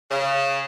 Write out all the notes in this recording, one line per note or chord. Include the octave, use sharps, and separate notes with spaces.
C#3